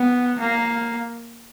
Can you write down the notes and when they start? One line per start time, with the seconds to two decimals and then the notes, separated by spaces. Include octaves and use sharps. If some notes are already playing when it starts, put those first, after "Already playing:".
Already playing: B3
0.40 A#3